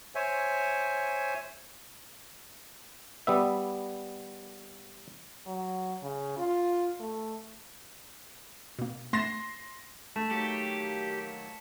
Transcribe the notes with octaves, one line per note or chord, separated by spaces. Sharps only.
C5 C#5 E5 G#5
G3 B3 E5
F#3
C#3
F4
A3
B2 A#3
A3 C6 A6 A#6 C7 E7
A3 A5 B6 E7
D#3 F#3 A#3 G4 C#7